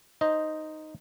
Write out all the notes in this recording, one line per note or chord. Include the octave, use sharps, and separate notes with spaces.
D#4 C5 D#5